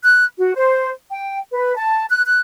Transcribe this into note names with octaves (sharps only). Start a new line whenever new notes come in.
F#6
F#4
C5
G5
B4
A5
F#6
F#6